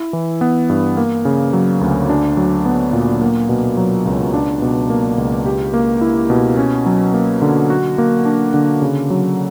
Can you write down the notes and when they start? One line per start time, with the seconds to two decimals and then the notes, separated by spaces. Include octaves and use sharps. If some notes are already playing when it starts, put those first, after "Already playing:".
Already playing: E4
0.13 E3
0.41 B3
0.69 G2
0.97 A#3
1.25 C#3
1.53 F#3
1.81 D2
2.09 D4
2.37 F#3
2.66 B3
2.93 A#2
3.21 A#3
3.49 B2
3.77 F#3
4.06 C#2
4.33 D4
4.62 B2
4.90 A#3
5.18 C#2
5.46 G4
5.74 A#3
6.01 E4
6.30 B2
6.57 C#4
6.86 F#3
7.14 A#3
7.42 D3
7.70 F#4
7.98 A#3
8.25 D4
8.54 D3
8.82 C#3
9.10 F#3